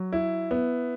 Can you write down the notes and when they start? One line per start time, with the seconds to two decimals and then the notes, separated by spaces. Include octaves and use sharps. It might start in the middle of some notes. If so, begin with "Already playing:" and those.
Already playing: F#3
0.12 E4
0.51 B3